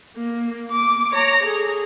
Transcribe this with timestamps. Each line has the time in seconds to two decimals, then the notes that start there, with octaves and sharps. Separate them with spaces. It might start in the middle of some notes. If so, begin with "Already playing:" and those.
0.16 A#3
0.71 D6
1.12 C#5 A#5
1.43 G#4 A4